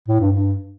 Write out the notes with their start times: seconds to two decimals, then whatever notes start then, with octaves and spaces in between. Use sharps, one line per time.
0.08 A2
0.20 G2
0.32 G2